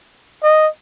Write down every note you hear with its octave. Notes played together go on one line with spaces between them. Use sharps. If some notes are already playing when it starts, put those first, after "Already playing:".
D#5